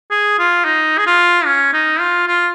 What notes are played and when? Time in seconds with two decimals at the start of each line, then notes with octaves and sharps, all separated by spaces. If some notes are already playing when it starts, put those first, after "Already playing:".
0.11 G#4
0.39 F4
0.65 D#4
0.98 G#4
1.07 F4
1.46 C#4
1.73 D#4
2.00 F4
2.27 F4